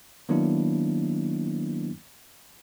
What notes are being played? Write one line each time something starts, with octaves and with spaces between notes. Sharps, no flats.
D#3 F#3 A#3 B3 D4 E4